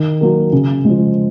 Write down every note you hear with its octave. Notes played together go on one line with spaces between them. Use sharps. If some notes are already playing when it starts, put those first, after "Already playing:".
Already playing: D#3
F#3 A#3
C#3
F3 G#3